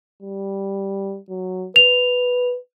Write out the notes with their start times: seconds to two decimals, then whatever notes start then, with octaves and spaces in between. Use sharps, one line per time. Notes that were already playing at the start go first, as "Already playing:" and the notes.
0.23 G3
1.29 F#3
1.76 B4 F7